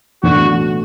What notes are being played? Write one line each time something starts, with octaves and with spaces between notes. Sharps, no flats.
B1 A2 E3 A3 D4 F#4